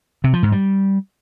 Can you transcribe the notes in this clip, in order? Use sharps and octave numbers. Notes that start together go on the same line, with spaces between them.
C3
F3
G#2
G3